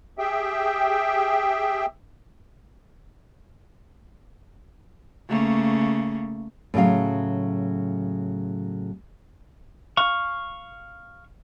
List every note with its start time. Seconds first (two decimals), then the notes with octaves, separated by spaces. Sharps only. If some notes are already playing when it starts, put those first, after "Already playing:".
0.18 G4 G#4 E5 G5
5.28 C#3 A3 A#3
6.74 A2 C#3 F#3 F5
9.97 F5 C#6